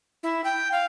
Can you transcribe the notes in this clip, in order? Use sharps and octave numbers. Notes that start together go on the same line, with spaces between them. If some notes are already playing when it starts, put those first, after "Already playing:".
E4
G5
F5